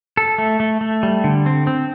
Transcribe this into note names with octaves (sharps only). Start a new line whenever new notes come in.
A4
A3
A3
A3
G3
D3
C4
C4